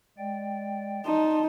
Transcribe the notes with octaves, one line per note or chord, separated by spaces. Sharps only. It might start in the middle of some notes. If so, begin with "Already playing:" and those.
G#3 D5 G5
D#4 D5 A5 C6